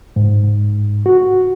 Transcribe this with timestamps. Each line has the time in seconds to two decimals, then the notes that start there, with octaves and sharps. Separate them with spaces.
0.16 G#2
1.06 F#4